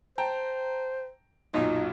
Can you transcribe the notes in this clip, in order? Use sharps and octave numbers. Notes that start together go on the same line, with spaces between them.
C5 G5 A5 A#5
B1 F#2 A#2 D#4